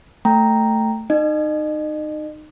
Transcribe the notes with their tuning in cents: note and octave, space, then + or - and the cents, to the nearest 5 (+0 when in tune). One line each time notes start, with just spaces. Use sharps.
A3 +10 G5 +0 A#5 +0
D#4 -20 D#5 -40